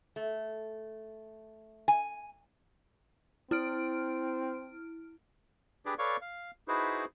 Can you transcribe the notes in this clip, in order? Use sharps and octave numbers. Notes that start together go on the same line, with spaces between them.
A3
G#5
C4 E4 F6 D7
D4 G4 G#4 B4 D5
A4 B4 C#5 D5 F5 C#6
F5
D#4 E4 F#4 G#4 B4 C5